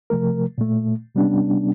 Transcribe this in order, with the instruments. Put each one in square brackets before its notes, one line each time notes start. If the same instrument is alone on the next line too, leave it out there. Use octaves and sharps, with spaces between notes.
[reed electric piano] C3 F3 A3 A#4
A#2 A3
C3 G3 B3 C#4 D4